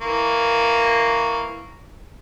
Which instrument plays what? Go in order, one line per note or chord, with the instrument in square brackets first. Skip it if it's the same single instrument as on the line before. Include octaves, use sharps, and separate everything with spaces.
[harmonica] E3 A#3 C#6